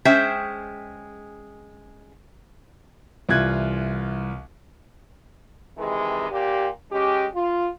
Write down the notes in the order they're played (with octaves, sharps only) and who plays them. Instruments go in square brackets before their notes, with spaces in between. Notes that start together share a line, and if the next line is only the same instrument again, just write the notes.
[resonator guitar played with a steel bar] G#3 C#4 G#4 C5 E5 G5
[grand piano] C2 E3 F4 F#6 G#6
[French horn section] C3 D#3 E3 G#3
A#2 G4
G#3 C#4 G4
F4